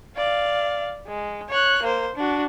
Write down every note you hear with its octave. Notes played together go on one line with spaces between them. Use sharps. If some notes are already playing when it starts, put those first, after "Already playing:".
D5 F5
G#3
C#5 F#6
A#3 C5
D4 F#4